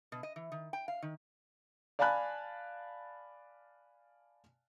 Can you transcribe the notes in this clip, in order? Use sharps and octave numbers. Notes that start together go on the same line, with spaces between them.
B2
D#5
E3
D#3
G5
F5
D#3
D5 F5 G#5 A5 B5 F#6